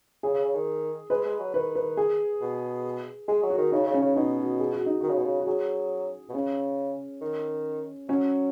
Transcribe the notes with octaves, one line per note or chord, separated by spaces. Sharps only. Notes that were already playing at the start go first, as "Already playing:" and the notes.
C#3 G#4
C#3
C#3
D#3
G#3 B4
G#3
F#3
D#3 B4
B4
G#4
B2
G#3 G#4
F#3
F#4
D#3
C#3 D#4
C#3
C#4
C#3
B2 D#4
F#4
G#4
F#4
D#4
D#3 F#4
C#3
B2
C#3
F#4
F#3 G#4
B2
C#3 C#4
D#3
F#3 C#4